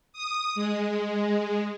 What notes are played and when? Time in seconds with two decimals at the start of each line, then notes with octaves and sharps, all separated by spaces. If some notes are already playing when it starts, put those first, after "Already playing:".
0.13 D#6
0.55 G#3